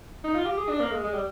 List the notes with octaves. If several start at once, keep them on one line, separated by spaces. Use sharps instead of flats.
D#4
F4
G4
G#4
D4
A#3
G#3
G#3
G3